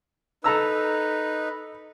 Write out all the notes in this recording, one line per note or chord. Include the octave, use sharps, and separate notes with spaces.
D#4 A4 B4 A#5 E6